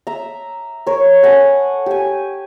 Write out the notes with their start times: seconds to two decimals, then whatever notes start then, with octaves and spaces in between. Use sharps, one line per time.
0.07 E5 A#5
0.86 A#4 C#5
1.23 A4 F#5 G#5
1.86 G4 G#5